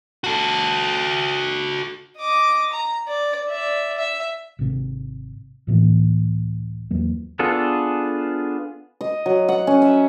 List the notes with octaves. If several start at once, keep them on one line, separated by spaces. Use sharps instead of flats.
F#4 A4
D#5 D6
A#5
D5
D5 E5
E5
G#1 C3
C#2 A2 E3 A#3
E2 F#3 A#3
B3 D4 F4 G#4 A4
D#5
F#3
F#5
C#4
E5